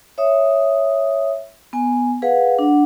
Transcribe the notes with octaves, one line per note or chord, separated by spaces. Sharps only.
C#5 E5 D#6
B3 G#5
G#4 B4 F5 F#5
D4 F#5